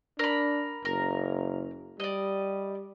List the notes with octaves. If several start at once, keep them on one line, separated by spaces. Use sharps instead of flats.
D4 A#4 B5
F#1 A#4
G3 D5 D#5